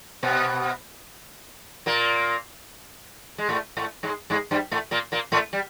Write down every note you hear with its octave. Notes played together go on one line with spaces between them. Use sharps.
B2 B3
A#2 A#3
G#3
A2 A3
A2 A3
G#2 G#3
G#2 G#3
G2 G3
A2 A3
A#2 A#3
A#2 A#3
A2 A3
G3